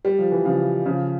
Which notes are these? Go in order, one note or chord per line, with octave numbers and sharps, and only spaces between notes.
G3
F3
E3
C#3 F3
C#3 F3